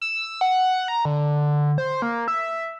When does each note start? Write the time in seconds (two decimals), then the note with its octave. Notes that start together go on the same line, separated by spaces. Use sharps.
0.01 E6
0.41 F#5
0.88 A#5
1.05 D3
1.78 C5
2.02 A#3
2.28 E5